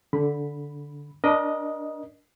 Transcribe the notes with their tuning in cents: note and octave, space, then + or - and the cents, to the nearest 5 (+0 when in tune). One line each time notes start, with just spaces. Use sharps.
D3 -10 B5 +0
D4 +0 A#4 +35 D#5 +0